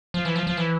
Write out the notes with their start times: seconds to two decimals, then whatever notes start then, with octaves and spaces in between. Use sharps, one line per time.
0.14 F3
0.25 E3
0.36 F3
0.47 F3
0.57 E3